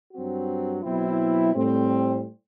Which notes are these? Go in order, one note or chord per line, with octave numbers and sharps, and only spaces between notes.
G2 F#3 C4 F#4
B2 F#3 C4 E4
A2 G3 C4